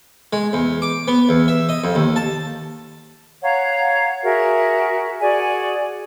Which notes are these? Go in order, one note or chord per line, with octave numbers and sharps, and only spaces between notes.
G#3
E2
D6
B3
E2
E5
D#5
F2
D#2
A5
C#5 F5 F#5 A#5
F#4 G#4 A#4 E5
F#4 G#4 D5 G#5